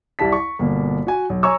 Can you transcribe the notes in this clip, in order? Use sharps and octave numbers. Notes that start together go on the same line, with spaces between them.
C2 G3 E4 A5 B6
C#6
G1 B2 A#3
F#4 G#5
B1
C#5 G#5 A#5 C#6 E6